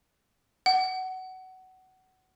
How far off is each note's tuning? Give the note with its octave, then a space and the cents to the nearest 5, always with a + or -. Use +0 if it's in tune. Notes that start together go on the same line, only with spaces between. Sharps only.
F#5 +20